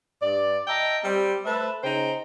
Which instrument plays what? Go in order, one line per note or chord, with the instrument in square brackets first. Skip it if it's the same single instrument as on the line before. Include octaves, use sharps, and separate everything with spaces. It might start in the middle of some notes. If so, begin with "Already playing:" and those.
[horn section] G2 D5
D#5 E5 G5 A5 A#5
G3 C4
A3 B4 C5 E5 A5
C#3 D#4 C5 G5 A#5